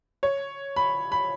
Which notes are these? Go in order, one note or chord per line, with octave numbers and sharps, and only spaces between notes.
C#5
B5
B5